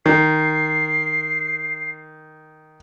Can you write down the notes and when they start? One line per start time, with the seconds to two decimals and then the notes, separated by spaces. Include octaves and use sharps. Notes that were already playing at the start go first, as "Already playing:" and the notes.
0.06 D#3 C7